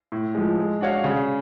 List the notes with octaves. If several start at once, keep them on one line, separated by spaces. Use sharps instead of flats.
A2
F3 G#3
G#3
D4 F#4 C#5 F5
C#3